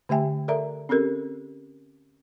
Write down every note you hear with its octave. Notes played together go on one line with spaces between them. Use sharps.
D3 A3 G4 E5 G5 G#5
A4 A#4 D5 E5 A#5
C4 C#4 G4 A4 A#4